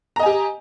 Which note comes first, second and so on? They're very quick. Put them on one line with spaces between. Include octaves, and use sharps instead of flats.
A#5 D#5 G#5 G4